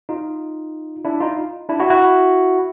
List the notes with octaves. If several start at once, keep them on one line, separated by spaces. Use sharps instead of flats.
D#4 F4
D4 E4
D#4 F4
D4 E4
E4 F#4
E4 F#4